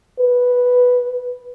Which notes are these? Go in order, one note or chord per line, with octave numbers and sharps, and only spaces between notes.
B4